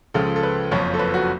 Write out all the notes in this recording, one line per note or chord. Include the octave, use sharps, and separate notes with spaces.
C#2 C#3 F3 A4
A4
B4
F#1 F2 F3 C#5
A4
B4
F#4